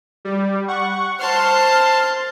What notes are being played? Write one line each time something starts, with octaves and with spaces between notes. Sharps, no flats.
G3
F#5 C#6
C5 A5 C6 F6